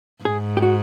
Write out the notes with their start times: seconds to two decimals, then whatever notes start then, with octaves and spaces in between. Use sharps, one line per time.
0.24 G#2 G#4
0.57 G4
0.62 F#4